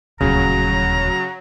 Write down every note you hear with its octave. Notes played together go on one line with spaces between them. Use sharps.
D#1 D2 C#3 F#3 A#5